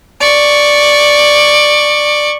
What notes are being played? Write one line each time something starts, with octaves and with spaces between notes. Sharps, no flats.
D5 C#6